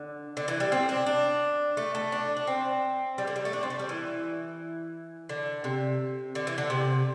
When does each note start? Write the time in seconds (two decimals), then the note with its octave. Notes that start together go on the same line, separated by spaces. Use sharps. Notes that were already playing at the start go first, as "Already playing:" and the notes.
Already playing: D3
0.37 D3
0.48 E3
0.60 G3
0.72 C4
0.89 D4
1.06 D4
1.77 A3
1.95 A3
2.12 D4
2.36 D4
2.47 C4
3.18 G3
3.27 D3
3.36 G3
3.45 A3
3.53 D4
3.63 C4
3.70 A3
3.79 G3
3.89 E3
5.29 D3
5.64 C3
6.35 D3
6.47 E3
6.58 D3
6.70 C3